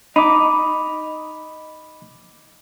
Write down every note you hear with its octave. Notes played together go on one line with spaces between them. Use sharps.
D#4 B5 D6